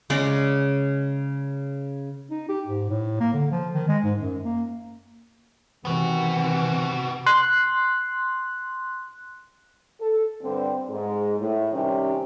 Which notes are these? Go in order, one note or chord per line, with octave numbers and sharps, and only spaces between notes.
C#3 G#3 D5
D#4
G4
G#2
A2
A#3
D3
F3
D#3
G#3
G#2
F#2
A#3
C3 D#3 E3 B3 C4 F#4
C6 F#6
A4
G2 D3 C4
G#2
A2
C3 D#3 G3 C#4 G4